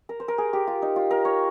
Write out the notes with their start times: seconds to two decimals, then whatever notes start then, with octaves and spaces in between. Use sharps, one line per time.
0.09 A#4
0.20 C5
0.28 A#4
0.38 G#4
0.53 G4
0.67 F4
0.82 D#4
0.96 F4
1.11 A#4
1.25 C#5